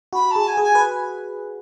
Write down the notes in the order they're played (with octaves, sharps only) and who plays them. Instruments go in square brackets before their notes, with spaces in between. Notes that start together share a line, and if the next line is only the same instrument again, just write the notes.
[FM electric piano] F#4 [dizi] B5
[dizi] A5
[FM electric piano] G#4
[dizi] G#5
[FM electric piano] G#4
[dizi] G#5
[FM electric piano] B4